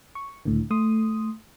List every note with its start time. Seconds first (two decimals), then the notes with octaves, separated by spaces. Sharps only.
0.15 C#6
0.45 C#2 A2 D3
0.71 A3 C6 D#6